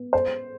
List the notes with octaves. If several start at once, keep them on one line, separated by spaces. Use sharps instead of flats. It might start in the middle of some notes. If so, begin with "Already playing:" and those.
Already playing: B3
C5